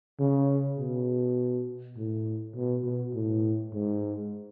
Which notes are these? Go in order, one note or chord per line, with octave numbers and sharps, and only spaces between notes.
C#3
B2
A2
B2
B2
A2
G#2